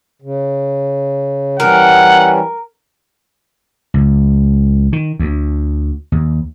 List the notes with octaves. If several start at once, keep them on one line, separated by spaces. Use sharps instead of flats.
C#3
E3 G3 C#4 A#4 F#5
C#2
D#3
D2
D#2